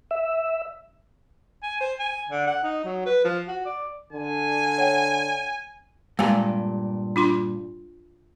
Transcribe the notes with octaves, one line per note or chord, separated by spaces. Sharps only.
E5
G#5
C5
G#5
D3
F#5
D#4
F#3
B4
F3
F#4
D5
D3 G#5
C#5 F#5 G5
G2 A#2 G#3 G#5
D4 F4 C6